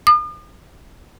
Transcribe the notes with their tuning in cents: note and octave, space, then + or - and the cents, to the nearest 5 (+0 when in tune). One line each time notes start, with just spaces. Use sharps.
D#6 -45